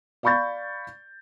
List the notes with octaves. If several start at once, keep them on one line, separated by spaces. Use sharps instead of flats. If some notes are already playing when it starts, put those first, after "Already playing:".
D5 F5 B5 C#6 G6 A6